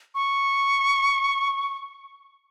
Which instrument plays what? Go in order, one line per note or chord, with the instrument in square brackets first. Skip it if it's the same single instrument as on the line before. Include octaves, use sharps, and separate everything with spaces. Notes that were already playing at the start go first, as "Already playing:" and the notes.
[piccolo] C#6